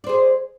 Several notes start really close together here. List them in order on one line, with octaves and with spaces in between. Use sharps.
D5 C5 G#4